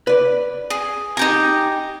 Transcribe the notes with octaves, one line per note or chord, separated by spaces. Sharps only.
B4 D5
G#4
D#4 G4 G#5 A#5